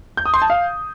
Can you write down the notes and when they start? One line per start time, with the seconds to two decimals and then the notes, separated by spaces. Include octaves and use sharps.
0.17 G6
0.26 D#6
0.34 C6
0.42 A5
0.50 F5